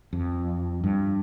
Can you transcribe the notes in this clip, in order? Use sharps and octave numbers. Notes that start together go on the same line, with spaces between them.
F2
G2